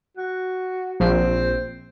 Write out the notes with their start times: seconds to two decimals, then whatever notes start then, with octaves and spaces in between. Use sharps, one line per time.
0.17 F#4
1.00 A#1 C4